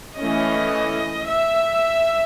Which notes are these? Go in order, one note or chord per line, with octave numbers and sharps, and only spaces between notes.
E3 A3 C#4 D#5
E5